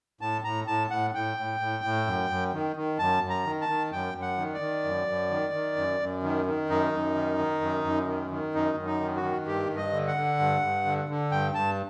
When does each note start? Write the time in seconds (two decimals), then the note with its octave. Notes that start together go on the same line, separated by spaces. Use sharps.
0.21 A2 A5
0.44 A2 A#5
0.67 A2 A5
0.90 A2 F#5
1.15 A2 G5
1.37 A2
1.60 A2
1.84 A2
2.07 F#2
2.30 F#2
2.53 D#3
2.76 D#3
2.99 F#2 A5
3.23 F#2
3.30 A#5
3.45 D#3
3.61 A5
3.69 D#3
3.92 F#2 G5
4.14 F#2
4.22 F#5
4.38 D#3
4.54 D5
4.60 D#3
4.84 F#2
5.07 F#2
5.31 D#3
5.53 D#3
5.77 F#2
6.00 F#2
6.23 D#3
6.46 D#3
6.69 F#2 D#4
6.93 F#2
7.15 D#3
7.38 D#3
7.61 F#2
7.84 F#2
8.07 D#3
8.31 D#3
8.54 F#2 D#4
8.77 F#2
8.85 D#4
9.01 D#3
9.16 F#4
9.23 D#3
9.46 G2 G4
9.70 G2
9.77 D#5
9.93 D3
10.08 F#5
10.16 D3
10.39 G2
10.62 G2
10.85 D3
11.09 D3
11.31 G2 G5
11.55 G2 A5